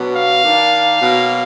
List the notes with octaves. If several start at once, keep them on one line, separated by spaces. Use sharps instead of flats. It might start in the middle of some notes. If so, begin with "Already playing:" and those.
Already playing: B2 F#3 B3 D4
F5
D#3 A#3 D4
B2 F#3 A#3